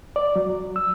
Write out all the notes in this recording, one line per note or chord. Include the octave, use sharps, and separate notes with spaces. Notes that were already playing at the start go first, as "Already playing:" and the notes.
D5
F#3
E6